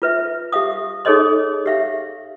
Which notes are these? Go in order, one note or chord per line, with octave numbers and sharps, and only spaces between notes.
F4 B4 E5
G4 E5 F5 D#6
D#4 G#4 A4 C#5 D#5 C6
G4 E5 F5